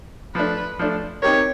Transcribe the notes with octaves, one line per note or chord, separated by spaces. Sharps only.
F3 A3 D4 B4
F3 A3 D4
C4 D#4 G4 A#4 C#5